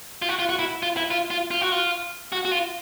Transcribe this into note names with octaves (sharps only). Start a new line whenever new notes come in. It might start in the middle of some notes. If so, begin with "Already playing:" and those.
F4
F#4
F4
F#4
E4
F4
E4
F4
F4
F4
F#4
F4
F#4
F#4
F4